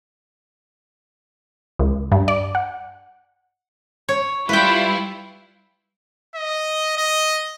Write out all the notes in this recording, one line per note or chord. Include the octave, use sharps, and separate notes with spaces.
C#2
G2
D5
F#5
C#5
G3 E4 F4 B4 G5
D#5
D#5